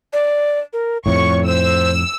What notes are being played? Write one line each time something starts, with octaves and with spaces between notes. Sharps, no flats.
D5
A#4
F2 A2 C#5 C#6
C5 E6